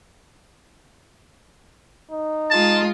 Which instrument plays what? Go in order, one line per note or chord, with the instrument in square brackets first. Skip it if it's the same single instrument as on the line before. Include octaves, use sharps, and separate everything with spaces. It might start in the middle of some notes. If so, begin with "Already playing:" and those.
[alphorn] D#4
[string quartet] G#3 F4 [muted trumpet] A5